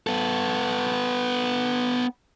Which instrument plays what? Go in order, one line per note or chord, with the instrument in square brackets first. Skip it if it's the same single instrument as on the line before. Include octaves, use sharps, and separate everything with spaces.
[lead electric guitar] B3 A4